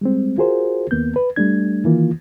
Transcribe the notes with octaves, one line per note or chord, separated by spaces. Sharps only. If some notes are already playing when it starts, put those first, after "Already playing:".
G3 G#3 C4
F4 F#4 G#4 A#4 C5
D#2 A#3 B3 G6
B4
G3 A3 D4 G#6
D#3 E3 A#3 F4